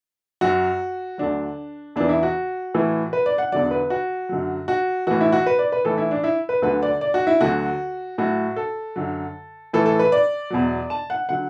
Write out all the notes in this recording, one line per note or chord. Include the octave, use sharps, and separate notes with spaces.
F#2 F#3 F#4
D2 D3 F#3 D4
E2 E3 D4
E4
F#4
A2 E3
B4
D5
F#5
E2 D3 F#3 D5
B4
F#4
F#2 D3 F#3
F#4
A2 E3 F#4
E4
F#4
B4
D5
B4
A2 E3 A4
E4
D4
E4
B4
D2 D3 F#3 B4
D5
D5
F#4
E4
D2 D3 F#3 F#4
A2 F#3 F#4
A4
F#2 D3 F#3
A2 E3 A4
A4
B4
D5
E2 B2 F#3
A5
F#5
D3 F#3 F#5